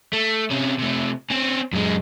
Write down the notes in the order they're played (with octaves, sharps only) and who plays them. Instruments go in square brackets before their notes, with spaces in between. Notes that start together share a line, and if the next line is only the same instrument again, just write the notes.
[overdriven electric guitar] A3
C3 C#4
C3 A3
C4 C#4
F#2 G#3